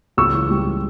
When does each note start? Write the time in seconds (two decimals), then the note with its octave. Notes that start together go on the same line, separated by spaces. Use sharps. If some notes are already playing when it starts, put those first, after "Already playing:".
0.17 C#2 C#6 E6
0.34 E3
0.51 G3